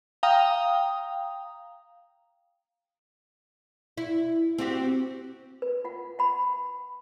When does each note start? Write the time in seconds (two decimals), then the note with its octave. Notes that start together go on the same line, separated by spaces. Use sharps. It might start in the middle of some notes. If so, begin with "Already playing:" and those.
0.23 F5 G5 A#5 D#6
3.98 E4
4.58 C4 F#4 G4
5.62 B4
5.84 F4 F#5
6.19 F#5 B5